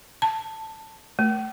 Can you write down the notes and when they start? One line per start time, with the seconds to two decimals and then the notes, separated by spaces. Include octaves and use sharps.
0.22 A5
1.19 A3